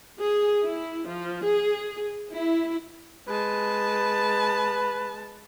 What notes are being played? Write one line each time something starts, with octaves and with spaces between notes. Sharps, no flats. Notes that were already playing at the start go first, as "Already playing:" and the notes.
G#4
E4
F3
G#4
E4
G#3 B4 A5